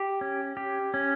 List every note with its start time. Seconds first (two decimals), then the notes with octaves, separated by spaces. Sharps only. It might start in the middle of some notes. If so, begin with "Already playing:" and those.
Already playing: G4
0.21 C#4
0.57 G4
0.94 C#4